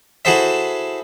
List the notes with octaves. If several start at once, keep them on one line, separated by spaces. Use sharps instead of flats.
E4 F#4 G#4 A4 C5 E5